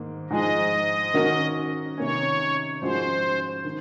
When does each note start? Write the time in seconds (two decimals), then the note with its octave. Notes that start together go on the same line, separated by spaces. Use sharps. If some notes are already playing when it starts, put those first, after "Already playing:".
Already playing: G#2 D#3 A#3
0.30 G#2 F3 G#3 D#4 G#4 D#5
1.14 D#3 A#3 C#4 F#4 A#4
1.98 C3 D#3 A#3 C#4 C#5
2.81 G#2 F3 G#3 C#4 F#4 C5
3.65 D#3